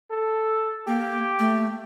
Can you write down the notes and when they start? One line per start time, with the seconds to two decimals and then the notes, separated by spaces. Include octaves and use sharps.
0.11 A4
0.87 A#3 G4
1.39 A3